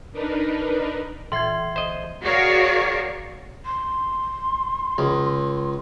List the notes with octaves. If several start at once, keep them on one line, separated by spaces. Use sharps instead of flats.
D4 D#4 A#4 B4
A#2 E3 E5 C6 G#6 C7
G1 C5 D#5
F#4 G#4 A#4 C#5 D5 F5
C6
C#2